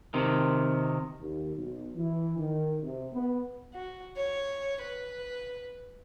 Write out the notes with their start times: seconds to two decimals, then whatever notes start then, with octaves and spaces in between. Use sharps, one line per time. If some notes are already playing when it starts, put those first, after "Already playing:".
0.14 C3 D#3
1.20 D#2
1.56 B1
1.96 E3
2.39 D#3
2.83 C3
3.13 B3
3.74 F#4
4.16 C#5
4.81 B4